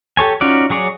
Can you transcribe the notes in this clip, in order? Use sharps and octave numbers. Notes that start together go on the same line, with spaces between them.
G4 A4 C#5 G#5
C#4 D#4 F4 F#4 D5
F#3 G#4 C#5 D5